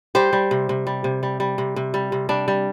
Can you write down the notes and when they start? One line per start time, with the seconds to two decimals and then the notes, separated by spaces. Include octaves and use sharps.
0.15 G3 G4 C5
0.33 G3
0.51 C3
0.69 C3
0.87 G3
1.04 C3
1.23 G3
1.40 G3
1.58 C3
1.76 C3
1.94 G3
2.12 C3
2.29 G3 D4
2.48 G3